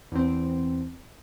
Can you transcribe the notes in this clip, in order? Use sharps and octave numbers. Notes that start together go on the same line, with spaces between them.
E2 C4